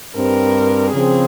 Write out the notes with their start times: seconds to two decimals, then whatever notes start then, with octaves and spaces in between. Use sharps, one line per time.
0.16 G2 G3 C4 A#4
0.93 C#3 F3 C4 G#4